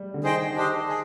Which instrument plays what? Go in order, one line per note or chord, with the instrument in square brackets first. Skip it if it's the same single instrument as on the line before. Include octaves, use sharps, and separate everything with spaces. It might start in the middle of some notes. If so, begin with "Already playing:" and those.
Already playing: [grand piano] G3
D3
[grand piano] D#3 [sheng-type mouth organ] G#4 C5 D#5 G5
[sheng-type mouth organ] D4 G4 C5 D#5
G#4